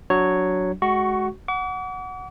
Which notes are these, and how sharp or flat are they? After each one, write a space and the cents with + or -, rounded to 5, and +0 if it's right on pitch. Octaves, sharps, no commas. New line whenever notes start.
F#3 +0 D4 -15 C#5 +0
G#3 +25 F#4 +15 C#6 +0
F#5 +0 D6 -45